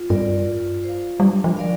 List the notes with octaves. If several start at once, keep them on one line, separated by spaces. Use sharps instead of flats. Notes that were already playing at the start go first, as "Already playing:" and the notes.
Already playing: F4
G2 A#4 D5
F4
C5 F5
G3 D4
F3
A#4 D5 F5